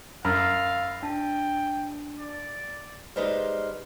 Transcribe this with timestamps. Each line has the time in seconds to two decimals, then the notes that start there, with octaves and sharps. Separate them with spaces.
0.25 F#2 F5 B5 E6 F6 A6
1.03 D4 G5 A5
2.18 D5
3.16 G3 G#3 D#4 B4 C5 F5